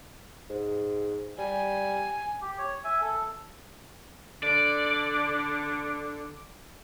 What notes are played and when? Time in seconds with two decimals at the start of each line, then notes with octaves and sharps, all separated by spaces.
0.49 G#2
1.38 G3 G#5
2.42 G4
2.58 C#5
2.84 E5 G#5
3.01 A4
4.43 D3 D5